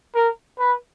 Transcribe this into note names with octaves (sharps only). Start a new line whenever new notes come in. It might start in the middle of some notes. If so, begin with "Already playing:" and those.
A#4
B4